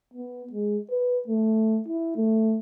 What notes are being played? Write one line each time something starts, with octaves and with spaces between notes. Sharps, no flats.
B3
G#3
B4
A3
E4
A3